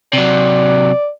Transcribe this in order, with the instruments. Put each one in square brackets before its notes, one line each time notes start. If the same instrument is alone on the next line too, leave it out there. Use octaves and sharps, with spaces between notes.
[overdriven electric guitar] C3 F#3 [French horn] D5